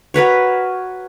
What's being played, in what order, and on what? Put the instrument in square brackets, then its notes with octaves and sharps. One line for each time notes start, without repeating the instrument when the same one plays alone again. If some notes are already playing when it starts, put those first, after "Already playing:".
[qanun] F#4 A#4 B4 C#5